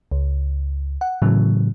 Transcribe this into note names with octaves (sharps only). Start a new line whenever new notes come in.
C#2
F#5
A2 C#3 E3 F#3